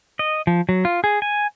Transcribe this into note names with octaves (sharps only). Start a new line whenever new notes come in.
D#5
F3
F#3
F4
G#4
G#5